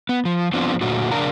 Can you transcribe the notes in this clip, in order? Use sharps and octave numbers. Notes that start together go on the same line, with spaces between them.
B3
F3
F3 B3 C4 D4 F4 C5
A#2 D3 F#3 A3 F#4
C#3 D4 A#4 D5 F5 A#5